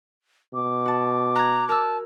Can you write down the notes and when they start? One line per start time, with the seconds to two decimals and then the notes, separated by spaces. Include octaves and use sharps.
0.54 B2 D6
0.86 F#4 A5
1.35 A#5 F#6 G#6
1.69 A#4 A5 E6